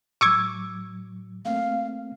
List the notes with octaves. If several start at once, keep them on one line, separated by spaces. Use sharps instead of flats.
A2 F#3 C#6 D6 E6 G#6
A3 A#3 C4 F5